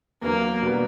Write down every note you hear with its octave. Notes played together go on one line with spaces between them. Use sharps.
E2 D3 F#3 A#3
B2 G3 B3